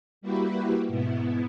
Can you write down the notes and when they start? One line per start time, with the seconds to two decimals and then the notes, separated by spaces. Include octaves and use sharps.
0.21 G3 A#3 E4 F#4 G4 B4
0.87 G#2 B2 B3 E4